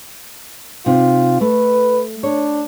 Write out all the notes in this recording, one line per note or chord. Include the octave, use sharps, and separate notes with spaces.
C3 D#4 F4
A3 B4
D4 C#5